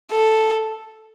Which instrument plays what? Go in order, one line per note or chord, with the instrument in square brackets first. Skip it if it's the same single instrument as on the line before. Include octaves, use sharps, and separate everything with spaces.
[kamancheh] A4